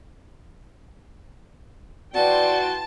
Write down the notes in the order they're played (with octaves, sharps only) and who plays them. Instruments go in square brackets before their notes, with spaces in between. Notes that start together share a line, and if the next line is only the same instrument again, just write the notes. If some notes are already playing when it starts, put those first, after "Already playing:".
[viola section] E3 G5 C6 [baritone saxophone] F#4 [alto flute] D5 [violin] A5